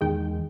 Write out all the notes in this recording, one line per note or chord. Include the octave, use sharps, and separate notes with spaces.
E2 D#3 G#3 G5